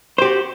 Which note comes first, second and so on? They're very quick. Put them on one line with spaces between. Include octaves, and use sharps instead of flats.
C5 G4 F#4